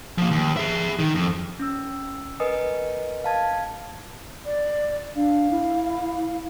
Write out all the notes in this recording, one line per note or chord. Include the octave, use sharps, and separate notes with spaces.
F3 A#3
D#2
G#4 E5
D#3
F2
C#4 E6
A#4 B4 D#5 G#5 D#6
F5 A5 G#6
D5
D4 F5
E4